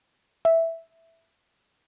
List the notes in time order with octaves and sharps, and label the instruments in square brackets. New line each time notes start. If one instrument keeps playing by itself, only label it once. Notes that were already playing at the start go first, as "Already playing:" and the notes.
[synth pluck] E5